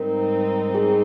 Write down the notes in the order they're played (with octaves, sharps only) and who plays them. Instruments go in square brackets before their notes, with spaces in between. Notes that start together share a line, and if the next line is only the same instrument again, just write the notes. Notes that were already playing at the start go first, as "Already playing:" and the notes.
Already playing: [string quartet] G#2 G3 C4 D#4 [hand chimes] A#4
[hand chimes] G#4